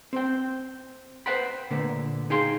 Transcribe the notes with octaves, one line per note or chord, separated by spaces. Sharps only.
C4 G5
B4 C5 F#5 G5 B5
A#2 D3 A3 B3
D#4 G#4 F5 G5 C6